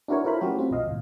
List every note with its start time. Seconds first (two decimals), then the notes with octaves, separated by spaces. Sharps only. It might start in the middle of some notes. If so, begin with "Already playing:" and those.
0.08 D4 E4 F#4 A#4 B4 C#5
0.24 E4 F4 A4 A#4 C5 B5
0.41 F#3 A3 C#4 F#4 G4
0.59 C4 F4
0.71 B1 C3 D#5 F5
0.86 D#2 A2